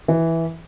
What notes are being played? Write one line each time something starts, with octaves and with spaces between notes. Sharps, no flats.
E3